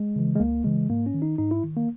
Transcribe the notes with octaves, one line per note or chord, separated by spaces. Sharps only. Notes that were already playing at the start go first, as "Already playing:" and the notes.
Already playing: G#3
C#3 E3
G#3
C#2 A#3
C#3 E3 G#3
G#2 A#3
C#4
D#3
D#4
G#2 D#4
E4
D#3
A#3